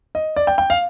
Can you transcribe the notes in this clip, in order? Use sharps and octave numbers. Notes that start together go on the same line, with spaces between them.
D#5
D5
G5
G5
F5